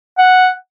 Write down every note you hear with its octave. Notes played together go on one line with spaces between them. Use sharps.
F#5